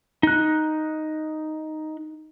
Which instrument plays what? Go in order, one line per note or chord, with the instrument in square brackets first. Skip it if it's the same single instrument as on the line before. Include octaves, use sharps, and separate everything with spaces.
[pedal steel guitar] D#4 F#6